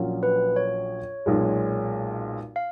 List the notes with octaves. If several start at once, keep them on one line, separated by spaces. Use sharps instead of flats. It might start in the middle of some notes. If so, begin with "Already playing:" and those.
Already playing: A#1 A#2 F#3 C#4 F4
B4
C#5
B1 A#2 G#3
F5